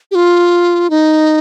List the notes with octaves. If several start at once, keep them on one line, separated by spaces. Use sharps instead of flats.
G4
F4
D#4